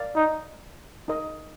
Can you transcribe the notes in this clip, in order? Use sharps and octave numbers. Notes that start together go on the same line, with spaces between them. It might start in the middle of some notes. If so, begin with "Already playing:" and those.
Already playing: A#4 D5 F5
D#4
D#4 A#4 D#5